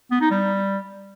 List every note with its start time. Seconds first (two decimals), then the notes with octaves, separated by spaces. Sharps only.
0.11 B3
0.21 D#4
0.31 G3